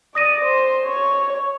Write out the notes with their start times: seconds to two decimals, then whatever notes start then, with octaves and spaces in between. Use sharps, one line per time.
0.15 D5 D#6 A#6 D#7
0.45 C5
0.86 C#5